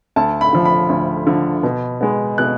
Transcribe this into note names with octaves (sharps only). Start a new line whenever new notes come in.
D2 A5
B5
D3 F3
B5
D2
D3 F3
B2
G#3 B3
B2 F#6